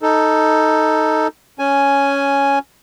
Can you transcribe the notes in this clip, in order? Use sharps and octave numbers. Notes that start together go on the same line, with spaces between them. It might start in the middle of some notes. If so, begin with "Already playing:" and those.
D#4 A4
C#4 G#5